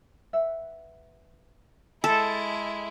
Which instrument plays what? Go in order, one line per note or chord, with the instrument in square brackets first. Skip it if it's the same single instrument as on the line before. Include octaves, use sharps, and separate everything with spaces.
[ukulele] B4 E5 F#5
[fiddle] G#3 E4 [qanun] A4